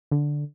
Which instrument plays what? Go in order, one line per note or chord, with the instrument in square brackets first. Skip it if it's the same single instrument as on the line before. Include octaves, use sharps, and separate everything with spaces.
[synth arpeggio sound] D3